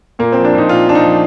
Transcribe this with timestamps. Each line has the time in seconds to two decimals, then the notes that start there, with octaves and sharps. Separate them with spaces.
0.19 A#2 A#3
0.32 F3 C4
0.45 D4
0.54 A#2 D#4
0.69 A#2 F4
0.87 F3 D4
0.95 D#4
1.04 F3